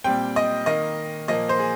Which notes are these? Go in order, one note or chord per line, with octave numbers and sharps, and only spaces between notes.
A#2 G3 C4 G5
D#5
D#3 A#3 D#5
A#2 F3 A#3 D#5
C5
G#4